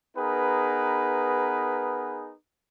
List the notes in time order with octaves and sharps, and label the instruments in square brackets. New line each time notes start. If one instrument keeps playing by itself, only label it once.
[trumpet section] B3 D#4 G#4 A#4 B4